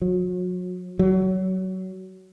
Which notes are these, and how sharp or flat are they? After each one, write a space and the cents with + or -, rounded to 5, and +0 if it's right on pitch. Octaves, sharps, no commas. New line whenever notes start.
F#3 -35
F#3 +20